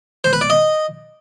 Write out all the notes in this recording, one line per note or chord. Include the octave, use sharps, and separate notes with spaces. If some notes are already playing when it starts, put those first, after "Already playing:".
C5
B4
D5
D#5